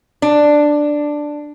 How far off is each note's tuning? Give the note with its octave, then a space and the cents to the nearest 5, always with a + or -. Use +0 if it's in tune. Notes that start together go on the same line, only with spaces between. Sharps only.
D4 +5